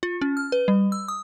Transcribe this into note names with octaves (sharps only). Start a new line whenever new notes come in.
F4
C#4
F6
B4
G3
E6
D#6